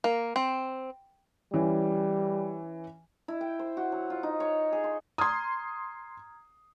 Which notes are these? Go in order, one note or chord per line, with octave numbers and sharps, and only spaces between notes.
A#3
C4
E3 G3 C#4
E4
G5
C5
F#4
F#3
F4
D#4
C#5
G#4
C6
A#5 C6 D#6 F6 G#6